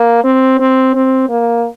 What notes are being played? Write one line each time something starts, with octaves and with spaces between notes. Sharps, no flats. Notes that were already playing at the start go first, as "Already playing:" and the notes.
Already playing: A#3
C4
C4
C4
A#3